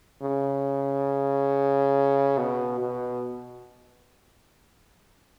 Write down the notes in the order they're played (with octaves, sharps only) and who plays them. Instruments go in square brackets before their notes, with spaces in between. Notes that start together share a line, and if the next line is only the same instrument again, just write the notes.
[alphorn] C#3
B2
B2